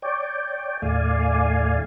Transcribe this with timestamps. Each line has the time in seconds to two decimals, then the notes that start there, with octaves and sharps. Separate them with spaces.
0.02 C#5 D5 G5
0.82 D#2 A2 A3 D5 F5 G#5